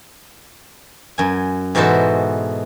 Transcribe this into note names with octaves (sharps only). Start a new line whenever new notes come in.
F#2 G#5
G#2 B2 E3 F#4 A4 C5